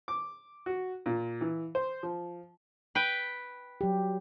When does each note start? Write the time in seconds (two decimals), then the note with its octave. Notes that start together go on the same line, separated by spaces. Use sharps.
0.08 D6
0.66 F#4
1.06 A#2
1.41 E3
1.75 C5
2.03 F3
2.95 B4 G5
3.81 F#3 G4